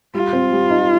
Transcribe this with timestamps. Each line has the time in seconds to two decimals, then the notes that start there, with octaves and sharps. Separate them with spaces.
0.14 G3 F4
0.33 C4
0.52 G3
0.70 D#4